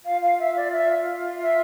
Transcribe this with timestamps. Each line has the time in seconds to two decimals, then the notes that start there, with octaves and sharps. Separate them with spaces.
0.05 F4 F5
0.23 F5
0.39 E5
0.57 D5
0.73 E5
1.42 E5